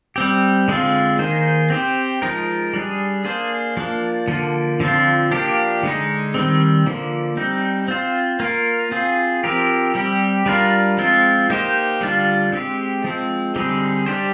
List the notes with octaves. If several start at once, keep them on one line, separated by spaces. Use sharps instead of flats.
G3 C4 G4
D3 G#3 C4 F4
D#3 A#3 D#4 G#4 C5
C4 G4 C5
F3 G#3 D#4 A#4
G3 D4 G#4
A#3 D4 G#4 C5
F3 A#3 D4
D3 F3 A#3
D3 F3 C4 F4
F3 A#3 D4 G4
D3 G#3 D#4
D#3 G3 C4
D3 F3 A#3
G3 C4 D#4
C4 F4 C5
A#3 F4 A#4
C4 F4 G#4
F3 C4 G4 A#4
G3 C4 G4
G3 D4 F4 A#4
F3 G#3 C4 F4
A#3 D#4 G4 C5
D3 G3 D4 F4
G#3 C4 G4
F3 G#3 C4
D3 G3 C4 D#4 G#4
G3 D4 G4 C5